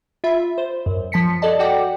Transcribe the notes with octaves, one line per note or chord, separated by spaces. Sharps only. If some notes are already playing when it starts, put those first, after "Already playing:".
F4 E5 B5
C5
F#2
F3 A5 B6 C#7
A4 D5 D#5 A5
F#4 A4 D5 F#5 G5 D6